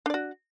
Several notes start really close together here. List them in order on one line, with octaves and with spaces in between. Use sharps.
D4 D5 F#4